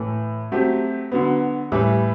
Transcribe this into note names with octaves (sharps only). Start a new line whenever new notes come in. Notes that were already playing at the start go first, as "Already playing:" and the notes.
Already playing: A2 E3 A3
F#3 A3 C4 G4
D3 F#3 B3
A2 E3 G3